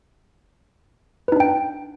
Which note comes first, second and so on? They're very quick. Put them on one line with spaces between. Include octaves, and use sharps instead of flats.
B4 D#4 D4 G5